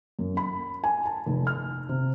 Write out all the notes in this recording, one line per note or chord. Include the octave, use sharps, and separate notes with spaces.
F#2
B5
G#5
A5
F1
F6
C3